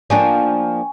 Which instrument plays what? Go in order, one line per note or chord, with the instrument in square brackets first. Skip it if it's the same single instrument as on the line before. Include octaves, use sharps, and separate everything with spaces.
[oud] F3 A#3 D4 [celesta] G5 G#5 C#6